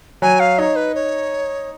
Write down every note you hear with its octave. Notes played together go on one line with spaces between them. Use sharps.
F#3 G#5
F5
D#4 C#5
B4
C#5